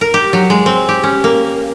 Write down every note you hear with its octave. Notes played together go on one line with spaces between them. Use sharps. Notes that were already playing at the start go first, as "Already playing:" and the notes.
A#4
G4
F#3
G#3
C4
G4
C#4
A#3